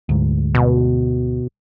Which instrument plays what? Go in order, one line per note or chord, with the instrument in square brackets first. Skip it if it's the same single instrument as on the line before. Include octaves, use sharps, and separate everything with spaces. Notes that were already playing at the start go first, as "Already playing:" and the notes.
[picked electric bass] D2 G#2
[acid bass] B2